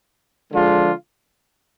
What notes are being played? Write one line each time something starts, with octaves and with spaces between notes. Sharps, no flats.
D3 F3 G#3 D4 F4